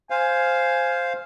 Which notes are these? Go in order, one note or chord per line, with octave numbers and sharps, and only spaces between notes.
C5 F5 G#5